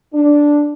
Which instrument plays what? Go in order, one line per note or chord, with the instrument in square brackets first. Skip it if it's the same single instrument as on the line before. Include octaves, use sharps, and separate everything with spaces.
[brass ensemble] D4